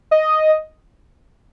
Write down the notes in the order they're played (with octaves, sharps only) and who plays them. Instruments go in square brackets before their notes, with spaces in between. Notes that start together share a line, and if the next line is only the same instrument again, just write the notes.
[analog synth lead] D#5